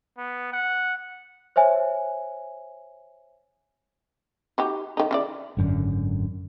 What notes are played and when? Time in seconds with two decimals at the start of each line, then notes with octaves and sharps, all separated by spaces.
0.18 B3
0.53 F#5
1.56 C5 C#5 E5 G#5
4.58 D#4 F#4 G4
4.97 D#3 D#4
5.11 C#3 E3 D5
5.57 G#1 F#2 D3